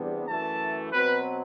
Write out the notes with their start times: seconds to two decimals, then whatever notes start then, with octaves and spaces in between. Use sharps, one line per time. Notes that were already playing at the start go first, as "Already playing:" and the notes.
Already playing: E2 C3 G3 B3 D4
0.26 F#2 E3 A3 A5
0.92 B2 F#3 C4 B4